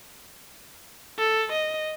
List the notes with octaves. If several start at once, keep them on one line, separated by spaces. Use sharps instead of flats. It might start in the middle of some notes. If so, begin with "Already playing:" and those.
A4
D#5